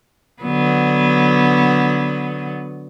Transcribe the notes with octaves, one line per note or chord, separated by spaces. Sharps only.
D3 F#3 B3